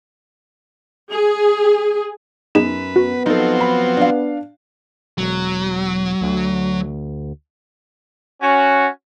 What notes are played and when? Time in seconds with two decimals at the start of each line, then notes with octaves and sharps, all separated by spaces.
1.12 G#4
2.55 F#2 B3 D#4 G#4 B4 E7
2.96 B3 F#4
3.26 F3 F#3 C4 D#4 A4
3.61 B5
3.97 D4 F5
5.18 E1 F#3
6.21 D2
8.42 C#4 F#4